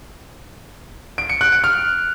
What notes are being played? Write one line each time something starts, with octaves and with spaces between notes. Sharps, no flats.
D7
C#7
F#6
D7
F6